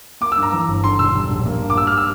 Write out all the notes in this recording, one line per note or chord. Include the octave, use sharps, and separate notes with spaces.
A#3 D6
E6
G2
A#5
E3
G1
D3 C6
E1 E6
G3
A#1
A#3
G2
D6
G3 E6
F6
E6